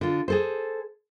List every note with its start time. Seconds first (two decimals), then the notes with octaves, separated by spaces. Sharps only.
0.01 D3 F4
0.28 G#4 A4 C5